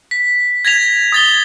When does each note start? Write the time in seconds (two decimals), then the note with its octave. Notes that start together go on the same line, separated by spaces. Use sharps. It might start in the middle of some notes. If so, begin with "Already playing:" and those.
0.11 B6
0.65 G#6 A#6 B6 F7
1.12 D#6 A6 G7